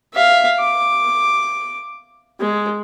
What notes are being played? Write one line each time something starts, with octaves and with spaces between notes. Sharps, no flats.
E5 F5
D6
G#3